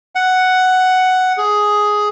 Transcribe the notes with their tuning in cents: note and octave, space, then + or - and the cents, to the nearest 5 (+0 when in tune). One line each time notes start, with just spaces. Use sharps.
F#5 +5
G#4 +5